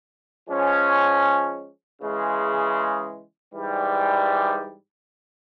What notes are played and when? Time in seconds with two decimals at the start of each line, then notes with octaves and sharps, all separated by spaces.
0.48 F3 G#3 C#4
2.00 C#3 E3 G#3
3.52 G#2 E3 G3